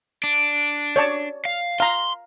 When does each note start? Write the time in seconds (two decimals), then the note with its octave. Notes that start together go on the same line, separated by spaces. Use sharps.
0.24 D4
0.96 C#5 D5 A5
1.45 F5
1.80 F5 A#5 C6